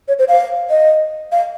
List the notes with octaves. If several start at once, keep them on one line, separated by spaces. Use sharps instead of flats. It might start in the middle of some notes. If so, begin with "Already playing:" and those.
C#5
C5
F5
D#5
F5